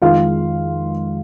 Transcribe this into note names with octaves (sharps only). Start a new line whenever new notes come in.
F2 D#3 G#3 F4 F5